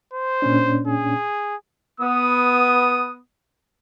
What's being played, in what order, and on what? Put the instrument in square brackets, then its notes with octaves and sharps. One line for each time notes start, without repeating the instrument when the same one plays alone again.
[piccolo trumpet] C5
[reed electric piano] A#2 C#4 D4
[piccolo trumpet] G#4
[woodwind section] B3 [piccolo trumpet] D#6